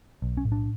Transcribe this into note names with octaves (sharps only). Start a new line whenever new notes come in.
B1
C#4
A2
D4